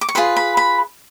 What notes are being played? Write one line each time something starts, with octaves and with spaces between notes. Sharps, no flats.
D6
C#6
F4 G#4 B4 C6
B5
B5